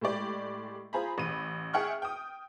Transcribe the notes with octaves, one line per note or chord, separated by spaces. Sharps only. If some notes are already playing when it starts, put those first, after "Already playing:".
A2 G#3 G4 D5
F4 G#4 C5 A#5 B5
A1 B5 D#7
G#4 E5 F#5 G5 C#6 F6
G5 D#6